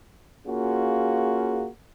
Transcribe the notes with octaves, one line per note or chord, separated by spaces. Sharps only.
A#3 C#4 F4 F#4 G#4